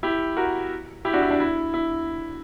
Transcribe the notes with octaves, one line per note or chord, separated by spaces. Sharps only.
E4 G4
F#4 A#4
E4 G4
D4 F#4
E4
D4
E4
E4